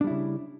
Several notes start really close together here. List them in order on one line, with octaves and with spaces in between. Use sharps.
D4 G3 E4 C#3